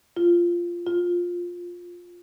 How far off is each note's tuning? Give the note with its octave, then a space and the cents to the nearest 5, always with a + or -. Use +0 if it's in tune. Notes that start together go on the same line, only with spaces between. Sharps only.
F4 -10
F4 +10